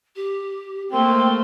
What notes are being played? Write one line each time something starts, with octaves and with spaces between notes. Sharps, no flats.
G4
A3 A#3 C4 C6